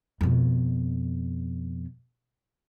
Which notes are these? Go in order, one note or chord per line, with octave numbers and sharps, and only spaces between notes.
F2 B2